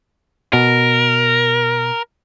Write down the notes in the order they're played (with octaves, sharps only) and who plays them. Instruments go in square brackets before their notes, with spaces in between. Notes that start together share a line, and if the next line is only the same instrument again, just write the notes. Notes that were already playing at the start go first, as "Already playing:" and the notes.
[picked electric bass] B2 [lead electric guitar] A#4